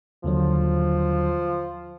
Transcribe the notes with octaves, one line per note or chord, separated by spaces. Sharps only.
D#2 D3 F3 F#3